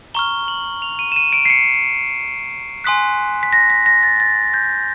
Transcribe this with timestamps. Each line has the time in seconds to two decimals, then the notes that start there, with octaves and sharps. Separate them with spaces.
0.14 A#5 C#6 F6 G7
0.48 F#7
0.82 F7
0.99 D#7
1.12 E7
1.16 D#7
1.33 D7
1.45 C7
1.50 C#7
2.84 G#5 C6 D#6 F#6 B6
3.43 B6
3.53 A#6
3.70 B6
3.86 A#6
4.03 A6
4.20 A6
4.54 G6